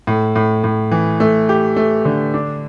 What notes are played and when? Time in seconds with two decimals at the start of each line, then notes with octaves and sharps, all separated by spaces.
0.07 A2
0.36 A2
0.64 A2
0.91 E3
1.20 A3
1.49 G4
1.76 A3
2.05 D3
2.34 D4